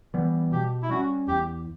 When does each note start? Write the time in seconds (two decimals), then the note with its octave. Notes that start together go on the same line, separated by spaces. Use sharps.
0.14 E3 G3 B3
0.52 B2 G4
0.83 E4
0.89 G3 C#4 F#4
1.27 E2 G4